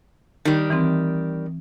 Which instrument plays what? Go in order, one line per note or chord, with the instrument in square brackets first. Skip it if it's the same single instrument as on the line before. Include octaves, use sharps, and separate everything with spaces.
[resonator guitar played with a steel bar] D#3 G3
[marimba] E3 C4